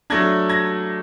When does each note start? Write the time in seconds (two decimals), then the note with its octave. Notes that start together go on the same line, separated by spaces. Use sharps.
0.10 F#3 A3 D4 G#6 A#6
0.49 G#6 A#6